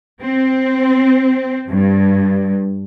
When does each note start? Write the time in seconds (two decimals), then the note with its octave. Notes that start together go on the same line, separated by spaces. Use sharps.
0.21 C4
1.68 G2